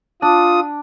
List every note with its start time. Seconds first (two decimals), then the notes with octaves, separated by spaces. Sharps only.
0.22 D4 F4 D#6